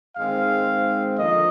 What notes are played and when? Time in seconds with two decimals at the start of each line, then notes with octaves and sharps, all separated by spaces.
0.17 G#2 D#3 G#3 C4 F5
1.18 D3 F3 A#3 D#5